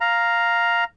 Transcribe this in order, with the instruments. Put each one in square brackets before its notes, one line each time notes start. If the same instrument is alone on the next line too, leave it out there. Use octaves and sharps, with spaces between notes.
[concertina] F5 A#5